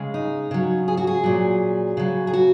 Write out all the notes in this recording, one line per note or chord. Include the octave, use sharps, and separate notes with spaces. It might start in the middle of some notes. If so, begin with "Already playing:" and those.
Already playing: C#3 G#3
D#4
C#3 F#3
G#4
F#4
G#4
A#2 F#3
C#3 F#3
G#4
F#4